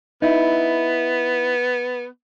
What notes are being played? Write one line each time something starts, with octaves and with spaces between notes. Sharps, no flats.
B3 D#4 E4